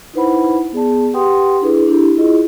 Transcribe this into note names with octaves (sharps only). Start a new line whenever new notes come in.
D#4 E4 B4 C5 F#5 B5
B3 G#4 D5 A5
G4 B4 F#5 G5 C6 D#6
D4 E4 G#4 B4
D4 E4 G4 A4
E4 F4 G#4 D#5